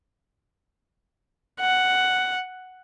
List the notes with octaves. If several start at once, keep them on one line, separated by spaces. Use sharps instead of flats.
F#5